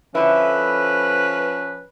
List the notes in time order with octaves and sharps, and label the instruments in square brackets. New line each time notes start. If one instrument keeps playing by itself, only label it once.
[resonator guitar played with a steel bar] D3 E4 [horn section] F3 C#4 B4